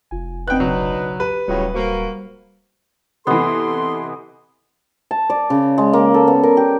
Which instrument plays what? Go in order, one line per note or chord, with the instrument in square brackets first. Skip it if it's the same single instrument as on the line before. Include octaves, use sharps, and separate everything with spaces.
[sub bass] F1 [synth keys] F4 G#5
[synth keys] C4 F#5 [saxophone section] D4 D#4 B4 [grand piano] G5 F#6
[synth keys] B1 C#3 [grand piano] F#3
[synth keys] G4 [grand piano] B4
[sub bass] D1 [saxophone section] A2 C#3 F#3 [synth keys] G3 F4 C6
[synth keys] G3 C5 [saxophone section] A#3 F#4
[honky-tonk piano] C3 E3 [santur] B3 D#5 [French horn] A4 [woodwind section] C6
[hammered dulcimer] A5
D5
C#3
G#3
A#3
A4
B3
A#4
G4